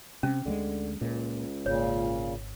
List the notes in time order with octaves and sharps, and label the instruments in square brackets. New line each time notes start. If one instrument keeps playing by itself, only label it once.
[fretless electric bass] C3 [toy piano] C#4
[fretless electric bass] D2 F#3 G#3 [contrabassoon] D3
[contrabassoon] C#2 [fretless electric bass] A#2
[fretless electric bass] G#1 [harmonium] A#2 C#3 [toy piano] C#5